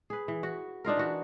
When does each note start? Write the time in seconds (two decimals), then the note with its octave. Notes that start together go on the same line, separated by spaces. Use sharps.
0.10 G#4 B4
0.28 E3
0.43 F#4
0.85 D4 D#4 F4 A#4
0.97 E3 F#4